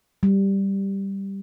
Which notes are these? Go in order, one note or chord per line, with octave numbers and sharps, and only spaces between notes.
G3